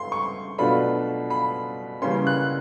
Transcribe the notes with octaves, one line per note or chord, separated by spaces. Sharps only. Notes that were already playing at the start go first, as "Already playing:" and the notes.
Already playing: A3 C6
C#6
B2 F#3 A3 D4 F4 B5
B5
C#3 E3 G3 A#3 C#4 C6
F#6